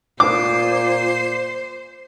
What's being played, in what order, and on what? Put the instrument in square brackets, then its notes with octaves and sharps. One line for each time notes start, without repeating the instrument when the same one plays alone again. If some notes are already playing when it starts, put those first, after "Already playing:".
[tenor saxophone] A#2 [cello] C5 [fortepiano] D6